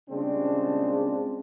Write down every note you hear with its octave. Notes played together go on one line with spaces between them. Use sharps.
A#2 C#3 G3 G#3 C4 D4